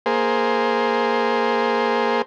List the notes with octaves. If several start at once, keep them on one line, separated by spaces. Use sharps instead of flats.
A#3 G#4 C5